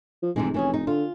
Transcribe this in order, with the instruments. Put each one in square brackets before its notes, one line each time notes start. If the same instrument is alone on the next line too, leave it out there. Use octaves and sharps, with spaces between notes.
[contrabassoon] F3
[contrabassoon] F1 [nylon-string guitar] C3 E3 G#3
[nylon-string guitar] E3 C#4 G#4
D#4
[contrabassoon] D3 [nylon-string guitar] F4